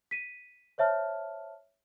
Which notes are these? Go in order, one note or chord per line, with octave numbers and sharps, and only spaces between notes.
B6 D#7
C5 C#5 E5 A5 F6